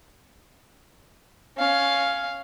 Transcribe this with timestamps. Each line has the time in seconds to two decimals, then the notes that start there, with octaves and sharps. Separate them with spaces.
1.57 C#4 F5